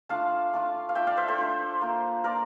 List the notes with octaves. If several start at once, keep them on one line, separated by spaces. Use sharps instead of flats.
A3 D4 F4 F5 A5
A3 D4 F4
F5
A3 D4 F4 E5 G5
D5 F5
C5 E5
A4 C5
A3 D4 F4
A#3 F4
A#3 F4 A#4 D5